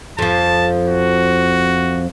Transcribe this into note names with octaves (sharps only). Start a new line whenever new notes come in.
F2 F3 A5
F#4